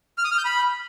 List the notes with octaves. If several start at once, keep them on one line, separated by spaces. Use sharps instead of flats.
F6
D#6
F6
G6
B5